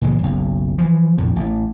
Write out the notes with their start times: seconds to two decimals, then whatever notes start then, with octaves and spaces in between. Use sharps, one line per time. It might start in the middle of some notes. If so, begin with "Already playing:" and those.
0.02 C#2 A#2 E3 G#3
0.19 F#1 B1
0.78 E3 F3
1.18 A#1 F2 A2
1.36 A1